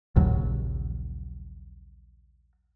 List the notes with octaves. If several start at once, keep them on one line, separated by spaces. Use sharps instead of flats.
A#1 D#2 C#3 F#3